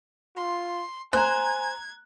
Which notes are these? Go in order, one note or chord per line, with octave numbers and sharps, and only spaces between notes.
F4 C6
C5 G#5 A#5 F#6 G#6